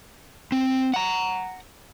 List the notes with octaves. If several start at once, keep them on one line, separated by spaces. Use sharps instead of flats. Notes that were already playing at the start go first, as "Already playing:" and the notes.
C4
F#5 A#5